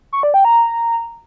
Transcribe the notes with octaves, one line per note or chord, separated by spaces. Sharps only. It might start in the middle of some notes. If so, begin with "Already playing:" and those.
C#6
D5
G5
A#5